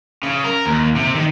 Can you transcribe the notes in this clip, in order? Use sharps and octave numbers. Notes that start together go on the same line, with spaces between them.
C#3
A#4
D#2
C3
D#3